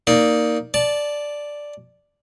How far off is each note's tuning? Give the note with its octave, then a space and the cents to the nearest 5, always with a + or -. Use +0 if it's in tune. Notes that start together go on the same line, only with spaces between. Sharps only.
A#3 +0 D#4 +15 D5 +0
D5 +0 A5 -10